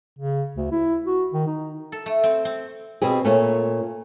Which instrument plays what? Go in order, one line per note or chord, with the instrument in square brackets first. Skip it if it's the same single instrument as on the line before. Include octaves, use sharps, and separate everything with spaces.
[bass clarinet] C#3
D2
E4
F#4
D#3
D#4
[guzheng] A4
A3
C4
C4
[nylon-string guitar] B2 C4 G#4
A#2 A3 C#4